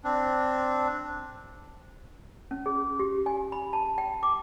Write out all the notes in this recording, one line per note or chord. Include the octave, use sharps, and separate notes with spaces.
C4 D4
C#4
G#4
G4
G#5
B5
A5
G5
D6